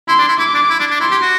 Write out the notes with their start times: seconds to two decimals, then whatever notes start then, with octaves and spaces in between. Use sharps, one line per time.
0.08 E4 C6
0.19 D4
0.29 E4
0.39 E4 D6
0.54 D4
0.70 E4
0.80 D4
0.90 D4
1.00 E4 C6
1.11 G4
1.22 F#4